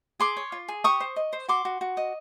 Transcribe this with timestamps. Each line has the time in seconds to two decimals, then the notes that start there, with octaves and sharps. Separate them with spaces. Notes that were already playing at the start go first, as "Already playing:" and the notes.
0.20 G#4 C6 D6
0.37 C#5
0.52 F4
0.68 G#4
0.84 G4 C#6 D#6
1.01 C5
1.16 D#5
1.33 C5
1.48 F#4 C6 D6
1.65 F#4
1.81 F#4
1.97 D#5